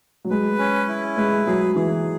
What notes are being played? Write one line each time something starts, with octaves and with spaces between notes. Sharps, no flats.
F#3
G#3 B4
C#4
E4
G#3 B4
F#3 G#4
E3 G#4